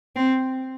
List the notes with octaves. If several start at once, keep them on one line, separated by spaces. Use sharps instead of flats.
C4